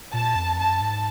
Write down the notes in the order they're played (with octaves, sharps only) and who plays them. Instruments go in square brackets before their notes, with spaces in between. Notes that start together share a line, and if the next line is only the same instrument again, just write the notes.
[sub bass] A#2 [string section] A5
[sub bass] F2
[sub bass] F#2 [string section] A5
[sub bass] G#2